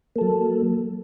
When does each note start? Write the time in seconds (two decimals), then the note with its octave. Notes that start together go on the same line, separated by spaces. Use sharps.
0.16 A#3
0.18 A4
0.21 F#3